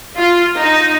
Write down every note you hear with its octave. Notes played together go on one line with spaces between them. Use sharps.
F4
D#4